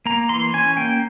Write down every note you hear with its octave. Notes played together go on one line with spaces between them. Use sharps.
A#3 A#5
E3 C6
C#4 G#5
A#3 G5